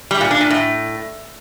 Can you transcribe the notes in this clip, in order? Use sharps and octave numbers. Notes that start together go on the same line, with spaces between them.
G3
A#2
D4
A#2
A2